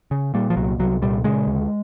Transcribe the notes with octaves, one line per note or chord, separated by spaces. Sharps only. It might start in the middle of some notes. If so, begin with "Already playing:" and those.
C#3
A#2 G3
F3
C2 F#3
C2 F#3
A#2 G3
C#3 G#3
D2